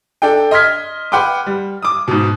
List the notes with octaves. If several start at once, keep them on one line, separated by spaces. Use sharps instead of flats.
D4 A4 G5
D#5 C6 D#6 F6 G#6 B6
B4 F#5 G5 C6 D6
G3
D6 D#6
G#2 B2